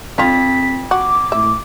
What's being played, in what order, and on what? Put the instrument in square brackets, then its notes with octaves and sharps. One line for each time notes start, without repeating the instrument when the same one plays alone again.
[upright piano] F2 [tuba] C4 [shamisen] D4 F4 [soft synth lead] B6
[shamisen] F#4 [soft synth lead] D6
[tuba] A2 [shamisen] E5